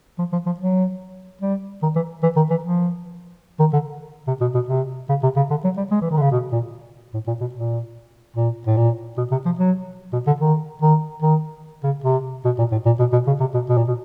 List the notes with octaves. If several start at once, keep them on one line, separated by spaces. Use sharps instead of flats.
F3
F3
F3
F#3
G3
D#3
E3
E3
D#3
E3
F3
D#3
D3
C3
B2
B2
C3
C#3
C3
C#3
D3
F#3
G3
G#3
E3
D#3
D3
C#3
B2
A#2
A2
A#2
B2
A#2
A#2
A2
A#2
B2
C3
F3
F#3
B2
D3
D#3
D#3
D#3
C#3
C3
B2
A#2
A2
A#2
B2
B2
C#3
C3
B2
B2
A#2
B2